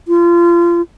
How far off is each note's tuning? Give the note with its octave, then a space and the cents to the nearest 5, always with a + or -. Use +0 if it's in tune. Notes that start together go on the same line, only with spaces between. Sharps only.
F4 -30